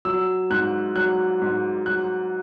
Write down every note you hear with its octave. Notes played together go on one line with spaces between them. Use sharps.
F#3 E6
G#2 F#6
F#3 F#6
G#2
F#3 F#6